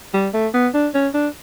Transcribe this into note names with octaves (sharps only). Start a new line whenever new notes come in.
G3
A3
B3
D4
C#4
D4